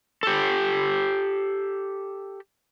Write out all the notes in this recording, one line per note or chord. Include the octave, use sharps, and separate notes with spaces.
G4 A4